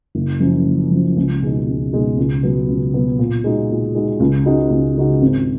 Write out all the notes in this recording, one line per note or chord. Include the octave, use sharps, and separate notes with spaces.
F#1
F#2 F3
F#1
F#2 F3
C#2
B2 G#3 D#4
C#2
B2 G#3 D#4
C#2
B2 F#3 B3
C#2
B2 F#3 B3
A#2
G#3 D#4 F#4
A#2
G#3 D#4 F#4
C#2
C#3 G#3 D#4 F#4
C#2
C#3 G#3 D#4 F#4
G#1